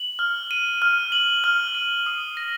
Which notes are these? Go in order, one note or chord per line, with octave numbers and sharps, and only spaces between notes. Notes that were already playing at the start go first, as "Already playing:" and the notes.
Already playing: F#7
F6
D#7
F6
F#7
F6
D#7
D#6
A#6